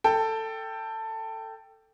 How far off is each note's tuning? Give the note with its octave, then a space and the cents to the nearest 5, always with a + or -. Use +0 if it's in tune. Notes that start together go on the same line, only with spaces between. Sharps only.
A4 +15 G5 +0